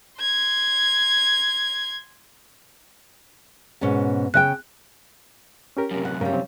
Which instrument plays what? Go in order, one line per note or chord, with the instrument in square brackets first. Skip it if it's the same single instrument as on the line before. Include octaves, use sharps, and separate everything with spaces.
[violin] C6 G#6
[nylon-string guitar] G#2 B2 C#4
[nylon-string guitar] C#3 D#5 G5 [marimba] F#6
[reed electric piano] C#4 G4 A#4
[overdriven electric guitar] F#2 C3
[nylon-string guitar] F#5
[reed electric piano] G2 A#4 [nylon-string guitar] C#3 G3
[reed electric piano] C4